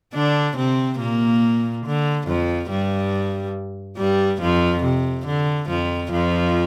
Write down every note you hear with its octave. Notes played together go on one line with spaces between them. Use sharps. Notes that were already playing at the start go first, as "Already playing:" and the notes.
D3 D4
C3 C4
A#2 A#3
D3
F2 F3
G2 G3
G2 G3
F2 F3
C3
D3
F2 F3
F2 F3